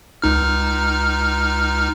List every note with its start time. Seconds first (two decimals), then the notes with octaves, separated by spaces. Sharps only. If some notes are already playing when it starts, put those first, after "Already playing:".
0.22 C#2 D#4 F6